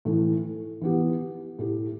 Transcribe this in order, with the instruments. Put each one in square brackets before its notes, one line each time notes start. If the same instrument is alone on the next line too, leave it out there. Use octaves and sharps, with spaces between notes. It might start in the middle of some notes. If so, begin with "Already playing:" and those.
[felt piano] A2 E3 A3
E3 B3 G4
A2 A3 G4